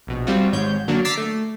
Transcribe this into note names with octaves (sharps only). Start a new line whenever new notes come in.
A#1 B2
G3 C4 F4 F#4
G#1 G#2 C#5 G6
D3 F#3 A#3 D4
A#5 D6 E6 A6 B6 C7
A3